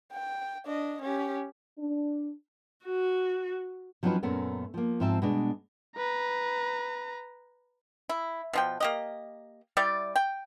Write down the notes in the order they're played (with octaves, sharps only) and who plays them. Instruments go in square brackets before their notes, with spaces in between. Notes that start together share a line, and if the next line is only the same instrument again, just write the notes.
[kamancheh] G5
D4 D#5
C#4 G4
[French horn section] D4
[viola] F#4
[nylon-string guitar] F3 F#3 C4 C#4 D#4 B4
F#2 A#2 A3 B3 C#4 A#4
F3 A#3
G#2 F3 C4 E5 A5
B2 G#3 D4
[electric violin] B4 A#5
[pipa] E4
B2 F3 G5
A#3 G4 D#5
G3 E4 G4 D5
G5